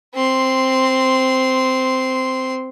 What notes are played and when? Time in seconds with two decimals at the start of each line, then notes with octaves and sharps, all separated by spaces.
0.15 C4 C6